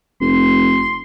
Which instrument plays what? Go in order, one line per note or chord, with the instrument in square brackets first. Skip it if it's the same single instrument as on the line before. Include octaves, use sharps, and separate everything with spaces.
[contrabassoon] F1 [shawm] C6